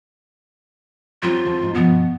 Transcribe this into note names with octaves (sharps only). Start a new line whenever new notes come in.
F#3 G3 C4 F4
E2 C4 A5
G#2 D4 D#4
G2 B2 F3 B3